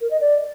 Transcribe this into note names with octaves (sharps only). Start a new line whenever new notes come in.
A#4
D#5
D5